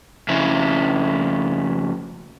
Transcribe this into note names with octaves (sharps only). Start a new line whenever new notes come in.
F2 C#3 E4